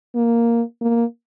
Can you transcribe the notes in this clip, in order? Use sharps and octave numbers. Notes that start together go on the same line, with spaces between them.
A#3
A#3